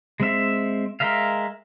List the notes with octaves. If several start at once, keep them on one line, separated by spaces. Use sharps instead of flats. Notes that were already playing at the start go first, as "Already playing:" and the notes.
G#3 C4 E5
G#3 A#4 E5 F5